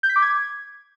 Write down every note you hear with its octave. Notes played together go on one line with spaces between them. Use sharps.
G6
B6
D6
G#6